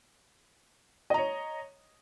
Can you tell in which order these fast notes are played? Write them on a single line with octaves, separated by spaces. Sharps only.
D#5 A#5 C#5